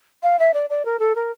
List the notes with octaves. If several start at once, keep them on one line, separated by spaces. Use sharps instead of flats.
F5
E5
D5
D5
A#4
A4
A#4